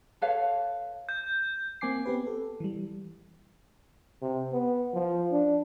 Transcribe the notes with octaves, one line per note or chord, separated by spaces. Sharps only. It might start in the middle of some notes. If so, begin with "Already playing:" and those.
A4 B4 C#5 F5
G6
A#3 C4 G#5 D6 C7
B3 C4 G4 B4
A4
E3 G3
C3
B3
F3
D4